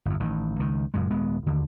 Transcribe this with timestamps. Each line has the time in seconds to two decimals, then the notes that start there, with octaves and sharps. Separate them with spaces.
0.05 G1 E2
0.20 A1 D#3
0.59 C#2 D#3
0.94 F#1 F#2 A#2 G#3
1.11 D#1 G#3 B3
1.46 D#2 D3